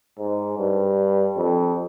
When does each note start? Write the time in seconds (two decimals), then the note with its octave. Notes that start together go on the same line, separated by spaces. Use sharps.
0.19 G#2
0.58 G2
1.37 F2